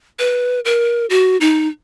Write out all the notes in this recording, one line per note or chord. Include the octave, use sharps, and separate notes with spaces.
B4
A#4
F#4
D#4